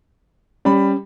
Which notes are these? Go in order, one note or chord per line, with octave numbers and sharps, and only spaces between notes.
G3 C#4 B5